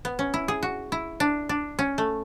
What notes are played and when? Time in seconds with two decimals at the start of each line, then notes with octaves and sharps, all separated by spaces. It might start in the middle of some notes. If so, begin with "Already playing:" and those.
0.05 B3
0.19 C#4
0.34 E4
0.48 G#4
0.63 F#4
0.92 E4
1.20 D4
1.49 D4
1.79 C#4
1.98 A3